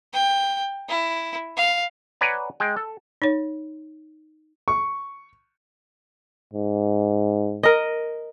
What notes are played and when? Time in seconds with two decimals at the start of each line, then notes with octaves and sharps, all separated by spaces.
0.13 G5
0.89 E4
1.57 F5
2.21 B4 C#5 D5 F#5 G#5 A#5
2.60 G#3 G5
2.77 A4
3.22 D#4 C#5
4.68 C#6
6.54 G#2
7.63 A#4 D#5